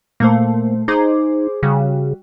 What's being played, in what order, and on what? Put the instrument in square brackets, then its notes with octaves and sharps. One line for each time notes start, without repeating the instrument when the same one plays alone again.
[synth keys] A#2 A3 C5 [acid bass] A#3
[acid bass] D#4 [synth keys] G#4 C5 D6
[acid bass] C#3 [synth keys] G3 F#4